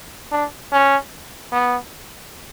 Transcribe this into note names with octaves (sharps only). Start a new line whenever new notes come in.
D4
C#4
B3